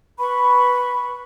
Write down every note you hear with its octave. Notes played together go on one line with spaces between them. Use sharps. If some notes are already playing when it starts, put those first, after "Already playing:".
B4 B5 C#6